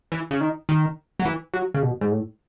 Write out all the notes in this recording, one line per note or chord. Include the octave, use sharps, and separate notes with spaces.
E3
C#3
D#3
D#3
F#3
E3
F#3
C#3
B2
G#2
A2